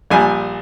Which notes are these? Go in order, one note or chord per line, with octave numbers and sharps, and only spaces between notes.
A#1 A#2 G3 G#5